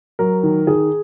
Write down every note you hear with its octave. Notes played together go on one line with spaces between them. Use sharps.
F#3 A#4
D#3
D#3 G#4